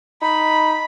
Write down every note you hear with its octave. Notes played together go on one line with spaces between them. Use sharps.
D#4 B5